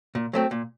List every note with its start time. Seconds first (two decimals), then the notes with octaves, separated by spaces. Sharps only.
0.15 A#2
0.33 F#3 A3 C4
0.51 A#2